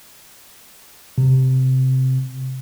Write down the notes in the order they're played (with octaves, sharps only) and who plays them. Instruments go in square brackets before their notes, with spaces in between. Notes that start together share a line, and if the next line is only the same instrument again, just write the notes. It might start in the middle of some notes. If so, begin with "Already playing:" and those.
[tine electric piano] C3